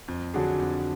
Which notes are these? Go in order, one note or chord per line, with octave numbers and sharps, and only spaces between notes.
F2
D3 F#3 D4 G#4
F2